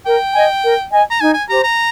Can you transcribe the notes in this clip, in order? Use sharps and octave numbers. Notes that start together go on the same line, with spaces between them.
A#4 G5
D#5 G#5
A#4
D#5 G#5
A#5
D#4 G#5
G#5
G4 C5 A#5
A#5